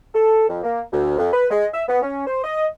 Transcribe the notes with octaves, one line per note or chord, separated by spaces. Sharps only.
A4
F2
A#3
D2
F2
B4
G#3
E5
B3
C#4
C5
D#5